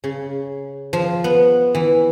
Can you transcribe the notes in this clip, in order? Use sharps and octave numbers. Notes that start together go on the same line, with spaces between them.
C#3
F3
B3
E3